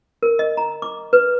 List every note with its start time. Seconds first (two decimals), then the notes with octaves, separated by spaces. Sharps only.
0.23 A#4
0.39 D#5
0.57 A#5
0.82 D6
1.13 B4